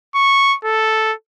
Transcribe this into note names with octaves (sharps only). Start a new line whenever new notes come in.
C#6
A4